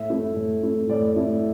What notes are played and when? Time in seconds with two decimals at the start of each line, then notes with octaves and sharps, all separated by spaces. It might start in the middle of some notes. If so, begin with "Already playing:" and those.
Already playing: A2 E5
0.10 A3 E4
0.36 A2
0.63 A3 E4
0.89 A2 D5
1.16 A3 E4